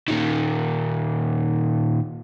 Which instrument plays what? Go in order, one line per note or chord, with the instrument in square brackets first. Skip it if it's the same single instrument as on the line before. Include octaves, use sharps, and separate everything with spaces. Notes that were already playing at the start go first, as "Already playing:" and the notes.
[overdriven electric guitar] A#2 D#3